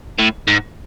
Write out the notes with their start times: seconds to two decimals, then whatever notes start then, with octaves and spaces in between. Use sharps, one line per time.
0.19 A2
0.48 G#2